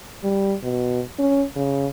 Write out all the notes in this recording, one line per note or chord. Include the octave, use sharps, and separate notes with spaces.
G3
B2
C#4
C#3